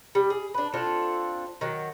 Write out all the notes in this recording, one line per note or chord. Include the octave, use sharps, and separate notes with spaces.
G3
G#4
D4 B4
C4 D4 F4 A4
D#3 F#3